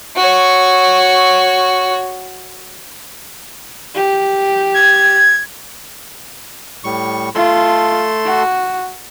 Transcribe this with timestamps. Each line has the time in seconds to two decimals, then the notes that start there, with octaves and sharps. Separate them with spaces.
0.17 F#4 C#5
3.95 G4
4.74 G#6
6.84 A2 G3 C#6
7.35 A3 F4 A4 C6
8.25 F#4